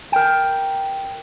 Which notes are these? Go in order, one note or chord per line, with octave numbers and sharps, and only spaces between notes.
A#4 G5